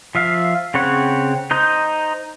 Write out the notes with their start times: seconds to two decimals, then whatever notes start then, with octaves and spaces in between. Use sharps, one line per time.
0.15 F3 E5 F5
0.74 C#3 C4 C#5 F#5
1.51 D#4 C5 G6